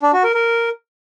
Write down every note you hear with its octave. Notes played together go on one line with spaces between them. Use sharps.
D4
F#4
A#4
A#4